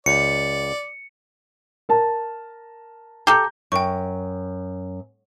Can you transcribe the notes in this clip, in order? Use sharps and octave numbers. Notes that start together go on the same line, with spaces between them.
C#2 D5 C#7
A#4 A5
G4 A4 A#5 G6
F#2 G5 C#6